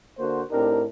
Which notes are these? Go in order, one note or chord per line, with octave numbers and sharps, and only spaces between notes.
D3 A#3 F#4 C5
A2 C4 D4 D#4 G4 A#4